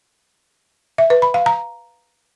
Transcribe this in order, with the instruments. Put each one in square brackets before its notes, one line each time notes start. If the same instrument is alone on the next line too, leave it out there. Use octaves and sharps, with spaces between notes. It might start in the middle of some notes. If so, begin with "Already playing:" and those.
[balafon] E5
B4
B5
F5
A#5